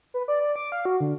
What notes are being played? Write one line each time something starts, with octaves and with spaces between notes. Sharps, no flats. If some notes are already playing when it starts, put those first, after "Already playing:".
B4
D5
D5
D6
F5
F#4
D3